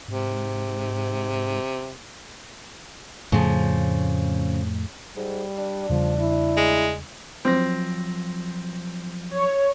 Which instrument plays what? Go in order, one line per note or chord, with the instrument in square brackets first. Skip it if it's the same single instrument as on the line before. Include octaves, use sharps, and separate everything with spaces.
[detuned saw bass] G#2 [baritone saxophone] C3
[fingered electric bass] F2 A2 A3 [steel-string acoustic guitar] C#3 F3
[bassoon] G#2 [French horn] G3
[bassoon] D4
[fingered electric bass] E2 C#3 G3 [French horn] F3
[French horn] E4
[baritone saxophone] G#3
[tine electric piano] F3 F#3 A#6 [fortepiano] C4
[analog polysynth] C#5